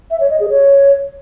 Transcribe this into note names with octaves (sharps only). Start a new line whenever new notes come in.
E5
C#5
D#5
G#4
C#5